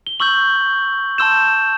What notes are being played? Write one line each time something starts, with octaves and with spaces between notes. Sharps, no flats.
G7
C#6 E6 G6 F#7
A5 C6 E6 G6 E7